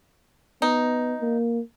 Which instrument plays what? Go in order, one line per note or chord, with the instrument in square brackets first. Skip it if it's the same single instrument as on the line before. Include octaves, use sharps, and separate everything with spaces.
[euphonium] B3 [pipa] D#4
[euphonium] A#3